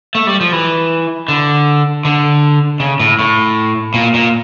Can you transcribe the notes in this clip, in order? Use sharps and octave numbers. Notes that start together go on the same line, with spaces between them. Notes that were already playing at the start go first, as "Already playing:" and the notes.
A3
G3
F3
E3
D3
D3
C#3
A2
A2
A#2
A#2